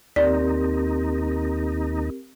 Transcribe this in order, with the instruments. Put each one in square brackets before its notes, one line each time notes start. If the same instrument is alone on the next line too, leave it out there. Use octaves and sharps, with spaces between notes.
[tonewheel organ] D#2 D#4 [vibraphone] C4 G4 A#4 [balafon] D5